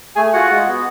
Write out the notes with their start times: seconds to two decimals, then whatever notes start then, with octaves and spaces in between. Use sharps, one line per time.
0.16 A3 G#4 G#5
0.33 F4 F#4 G#4 F#5
0.51 G#3
0.67 B3 F#4